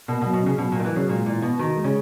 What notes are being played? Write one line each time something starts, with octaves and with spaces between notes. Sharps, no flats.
B2 A#3
B2
F#3
B2
C#3 C#4
B2 F#3
A#2
D#3 A#3
E3
C#3 F#3
A#2 G#3
A#2 E3
B2 B3
D#3 F#4
G#3
C#3